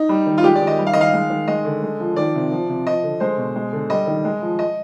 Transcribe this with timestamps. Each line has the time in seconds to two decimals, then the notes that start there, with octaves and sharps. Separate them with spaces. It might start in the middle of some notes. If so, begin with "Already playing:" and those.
Already playing: D#4
0.09 G3
0.27 D#3
0.38 F4
0.44 G#3 G4
0.55 D5
0.62 D#3
0.67 D#5
0.79 G3
0.87 F5
0.93 D#3 D#5
1.01 F5
1.14 G#3
1.30 D#3
1.48 G#3 D#5
1.65 D3
1.82 G#3
2.00 F3
2.16 D#3 D5
2.35 C3
2.52 F3
2.69 C3
2.86 F3 D#5
3.03 D3
3.20 G#3 C5
3.38 B2
3.55 G#3
3.73 D3
3.90 G3 D#5
4.07 D#3
4.24 G#3
4.42 F3
4.59 D#5